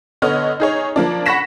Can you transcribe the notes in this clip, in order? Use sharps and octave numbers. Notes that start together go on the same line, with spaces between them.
D3 B3 C#5 D#5 F6
D#4 G#4 C#5
F3 A#3 D4
F#5 B5 C#6 A#6 B6 E7